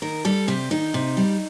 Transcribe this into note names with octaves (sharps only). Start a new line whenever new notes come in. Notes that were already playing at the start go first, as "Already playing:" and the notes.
D#3 A#4
G3 A4
C3 G4
D#3 D#4
C3
G3